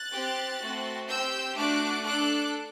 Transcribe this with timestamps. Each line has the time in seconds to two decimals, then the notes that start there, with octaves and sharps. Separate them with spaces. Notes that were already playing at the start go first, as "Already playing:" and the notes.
Already playing: F#6 A6
0.14 C4 G4
0.62 A3 C4 F#4
1.10 C4 G4 E6 G6
1.58 A3 D4 F#4 D6 F#6
2.06 D4 A4 D6 F#6